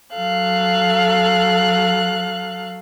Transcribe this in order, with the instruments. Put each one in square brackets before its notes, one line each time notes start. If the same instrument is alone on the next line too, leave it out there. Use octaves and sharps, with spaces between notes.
[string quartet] F#3 A4 F5 F#6